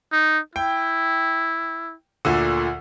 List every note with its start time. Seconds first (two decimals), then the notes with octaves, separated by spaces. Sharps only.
0.12 D#4
0.56 E4 G5
2.25 D2 A#2 D3